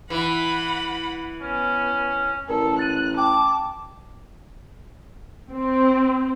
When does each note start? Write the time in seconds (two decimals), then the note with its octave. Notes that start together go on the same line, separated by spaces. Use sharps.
0.10 E3 F#5 B5
1.42 B3 C#4
2.49 A1 A4 A#4 D5
2.79 F#6 A6 D#7
3.17 G5 A5 D6
5.53 C4